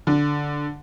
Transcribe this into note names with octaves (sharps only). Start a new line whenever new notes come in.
D3